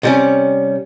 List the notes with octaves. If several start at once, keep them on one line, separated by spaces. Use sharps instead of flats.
C3 G3 C#4